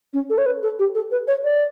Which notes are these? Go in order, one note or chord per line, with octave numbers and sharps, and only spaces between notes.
C#4
A4
C#5
B4
A4
G4
A4
B4
C#5
D5